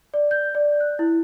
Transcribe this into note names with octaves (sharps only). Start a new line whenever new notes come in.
D5
G6
D5
F#6
E4